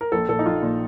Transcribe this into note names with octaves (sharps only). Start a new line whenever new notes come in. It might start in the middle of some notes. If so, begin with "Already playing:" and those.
A#4
A#1 A4
A#2 A4
D#4
A#1 F4
A#2